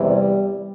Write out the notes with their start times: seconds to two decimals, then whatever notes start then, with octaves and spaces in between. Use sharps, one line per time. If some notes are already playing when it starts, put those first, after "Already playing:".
Already playing: E2 C3 E3 G3